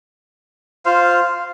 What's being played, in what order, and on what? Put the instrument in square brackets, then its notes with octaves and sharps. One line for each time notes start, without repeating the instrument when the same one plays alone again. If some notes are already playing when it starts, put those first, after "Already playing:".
[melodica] F4 C5 F5